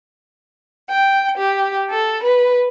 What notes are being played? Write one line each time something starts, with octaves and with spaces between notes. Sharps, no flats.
G5
G4
A4
B4